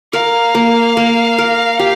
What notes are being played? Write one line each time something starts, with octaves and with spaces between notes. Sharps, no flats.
A#4 F5
A#3
A#3
A#4
G4